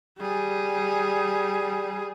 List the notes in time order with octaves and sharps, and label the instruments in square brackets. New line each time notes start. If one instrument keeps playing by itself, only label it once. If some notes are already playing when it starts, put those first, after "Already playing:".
[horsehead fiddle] G3 G#4